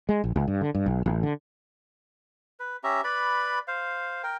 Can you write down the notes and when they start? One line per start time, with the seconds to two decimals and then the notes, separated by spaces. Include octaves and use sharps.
0.09 G#3
0.24 A#1
0.36 C#2
0.48 G2
0.61 D3
0.75 G2
0.86 B1
1.06 A1
1.23 D3
2.60 B4
2.84 C#4 G4 E5 A#5
3.04 B4 D5 B5
3.68 C5 F5
4.23 A#4 G5